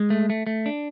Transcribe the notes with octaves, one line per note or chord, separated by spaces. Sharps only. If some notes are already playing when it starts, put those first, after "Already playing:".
Already playing: G#3
A3
A3
A3
D4